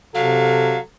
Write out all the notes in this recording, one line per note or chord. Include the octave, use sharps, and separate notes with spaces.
C3 F#3 A4 F5